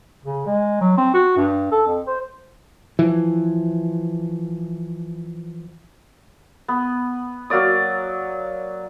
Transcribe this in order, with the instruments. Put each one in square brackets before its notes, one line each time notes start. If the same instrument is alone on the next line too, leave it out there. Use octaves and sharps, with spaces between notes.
[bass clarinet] C#3
G#3
F#3
C4
F#4
G2
A4
F2
C5
[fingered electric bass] E3 F3
[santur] B3
F#3 A#3 D5 D#6